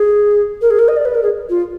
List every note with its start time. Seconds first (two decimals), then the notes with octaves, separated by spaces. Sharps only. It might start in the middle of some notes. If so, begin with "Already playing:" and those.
Already playing: G#4
0.61 A#4
0.70 G#4
0.78 A#4
0.88 D#5
0.96 D5
1.05 B4
1.14 A#4
1.22 G#4
1.49 F4